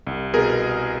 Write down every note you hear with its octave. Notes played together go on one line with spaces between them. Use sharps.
C2
B2 G#4 A#4